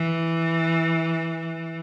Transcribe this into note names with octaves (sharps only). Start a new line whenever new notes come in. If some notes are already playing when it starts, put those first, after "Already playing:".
Already playing: E3